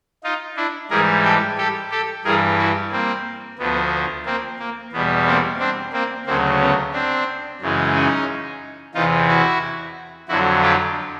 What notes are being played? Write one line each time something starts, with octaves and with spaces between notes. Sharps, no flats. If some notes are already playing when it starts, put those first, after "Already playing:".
D#4 F4
D4 E4
G#2 E3 G3 G#4 A#4
G4 A4
G4 A4
G4 A4
G2 E3 G3 G#4 A#4
E4 F#4
A#3 C4
D2 D3 F3 B3
A#3 C4
A#3
E2 B2 G3 B3
A#3 C4
C4 D4
A#3 C4
D2 C#3 F#3 A#3 C4
B3 C#4
C4 D4
F#2 C#3 E3 G#3
C#4 D#4
E2 C3 E3 D#4 F4
E4 F#4
F2 D3 F#3 E4 F#4
F4 G4